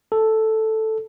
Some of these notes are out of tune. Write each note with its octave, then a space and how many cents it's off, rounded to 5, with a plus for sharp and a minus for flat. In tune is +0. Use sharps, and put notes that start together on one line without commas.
A4 +0